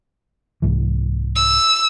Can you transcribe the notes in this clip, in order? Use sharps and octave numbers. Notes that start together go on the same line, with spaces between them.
C2 G#2 E3
E6